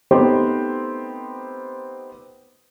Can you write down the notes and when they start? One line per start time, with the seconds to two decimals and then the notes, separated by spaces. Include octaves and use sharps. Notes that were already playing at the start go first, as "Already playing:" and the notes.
0.11 A3 B3 C4 D#4 G4